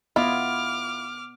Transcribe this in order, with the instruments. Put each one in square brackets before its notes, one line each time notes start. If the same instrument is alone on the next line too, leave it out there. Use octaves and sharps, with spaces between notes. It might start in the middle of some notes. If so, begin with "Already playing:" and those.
[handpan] B3 D#5 [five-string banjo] E4 F4 [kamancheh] D6 F6